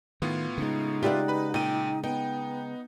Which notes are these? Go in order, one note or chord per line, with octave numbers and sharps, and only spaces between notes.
A2 D#3 B3 F4
C#3 G#3 D#4
F4 G4 B4 D5 E5 F#5
B4 B5
A#2 G5 D#7
B3 D#4 G5